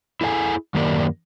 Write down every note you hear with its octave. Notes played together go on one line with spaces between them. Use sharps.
E4 G#4 A4 D5 G#5
F#2 D#3 A#3 G4 A#4 D5